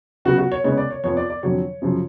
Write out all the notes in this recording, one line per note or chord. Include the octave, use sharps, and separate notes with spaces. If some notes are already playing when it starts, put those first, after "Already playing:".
C#3 F#3 B3 F#4
F#4
C#5
C#3 G#3 B3 C#5
D5
C#5
F2 F3 B3 C#5
D5
D5
F2 D3 F#3 C#5
F#2 C#3 F3